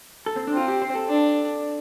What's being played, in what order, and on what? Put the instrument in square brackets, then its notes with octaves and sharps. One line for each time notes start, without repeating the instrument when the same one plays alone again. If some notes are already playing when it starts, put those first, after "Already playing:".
[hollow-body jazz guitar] A4
C4
D4
[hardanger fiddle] C4 [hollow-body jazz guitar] F4
[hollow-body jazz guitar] G4
C5
A4
[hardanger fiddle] D4